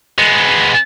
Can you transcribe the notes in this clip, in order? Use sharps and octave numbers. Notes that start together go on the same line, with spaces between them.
G#3 B3